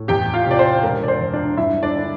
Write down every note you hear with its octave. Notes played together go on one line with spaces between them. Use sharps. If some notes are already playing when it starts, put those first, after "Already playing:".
Already playing: A2
E2 G4 G5
F4 F5
C3 D5
C5
E1 A#4
D5
C5
E2
D4 D5
G2 E4 E5
D4 D5
D3